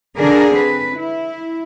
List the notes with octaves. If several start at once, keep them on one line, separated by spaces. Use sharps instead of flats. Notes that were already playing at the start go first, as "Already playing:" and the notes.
D3 D4 G#4 A#4
C4 B4
E4